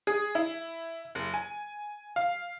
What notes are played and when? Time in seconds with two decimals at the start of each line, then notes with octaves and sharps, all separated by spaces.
0.07 G#4
0.35 E4
1.15 F#1
1.34 G#5
2.16 F5